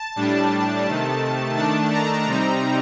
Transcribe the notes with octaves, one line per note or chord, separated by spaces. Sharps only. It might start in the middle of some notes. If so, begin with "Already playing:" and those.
Already playing: A5
A2 G3 D4
C3 D#3 A3
D#3 A3 D4 A5
A#5
C3 G3 C4 D#4 A#5